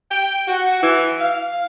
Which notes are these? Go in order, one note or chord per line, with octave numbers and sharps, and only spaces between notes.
G5
F#4
E3
F5